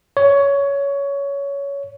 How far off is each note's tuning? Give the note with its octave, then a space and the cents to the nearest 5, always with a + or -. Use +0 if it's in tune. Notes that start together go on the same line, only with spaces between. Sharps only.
C#5 +15